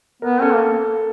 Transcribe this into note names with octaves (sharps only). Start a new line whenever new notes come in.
B3 A#4
C#4 A4
A#3